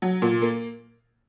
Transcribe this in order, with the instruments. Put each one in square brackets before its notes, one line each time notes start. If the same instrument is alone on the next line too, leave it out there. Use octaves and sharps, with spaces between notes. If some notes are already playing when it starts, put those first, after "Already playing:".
[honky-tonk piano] F#3
A#2
A#3